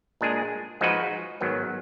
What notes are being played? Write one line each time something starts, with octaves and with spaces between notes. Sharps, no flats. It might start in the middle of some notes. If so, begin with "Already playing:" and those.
A#2 G#3 D4 G#4
F3 G#3 D#4 F#4 B4
G#2 D#3 F#3 B3